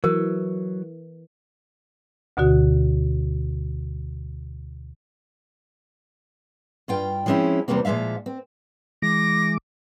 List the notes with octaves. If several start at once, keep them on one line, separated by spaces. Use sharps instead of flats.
E3 F#3 A#4
D2 B2 D3 F#4
G2 F4 G5
F3 G#3 C4 C#4 E4
E2 G#2 C3 G3 A#3 C4
A#2 F3 G#3 E5 F5
C4
E3 G#3 D6 A#6